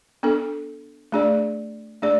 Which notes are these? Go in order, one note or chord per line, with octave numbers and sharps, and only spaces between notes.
B3 D4 A4
A3 D4 G#4 D5
A3 D4 G#4 D5